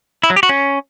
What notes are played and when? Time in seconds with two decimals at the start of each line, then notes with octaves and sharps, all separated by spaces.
0.23 E4
0.30 F#3
0.36 G4
0.43 F#4
0.49 C#4